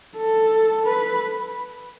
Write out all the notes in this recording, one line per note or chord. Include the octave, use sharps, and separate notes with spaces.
A4
B4